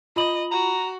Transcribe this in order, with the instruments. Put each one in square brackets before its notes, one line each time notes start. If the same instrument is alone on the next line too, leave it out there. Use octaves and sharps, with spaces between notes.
[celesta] F4 B5 F#7 [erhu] D#5
[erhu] F#4 [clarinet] A#5